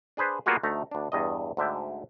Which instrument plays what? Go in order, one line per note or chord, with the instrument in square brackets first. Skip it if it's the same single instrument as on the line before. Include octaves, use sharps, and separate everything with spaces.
[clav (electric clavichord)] D4 G#4 B4 C5
G3 A#3 B3 F4 F#4 G#4
D2 A3 D#4 A#5
D2 D4
E2 G2 D#5
D2 G#2 D3 E5 G5